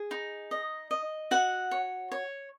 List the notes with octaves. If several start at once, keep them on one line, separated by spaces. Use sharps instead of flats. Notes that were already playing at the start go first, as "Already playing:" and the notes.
Already playing: G#4
D#4
D#5
D#5
F#4 F#5
C#5
C#5